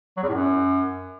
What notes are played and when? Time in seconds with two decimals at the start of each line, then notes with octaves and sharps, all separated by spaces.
0.17 F#3
0.23 E2
0.29 A2
0.35 F#2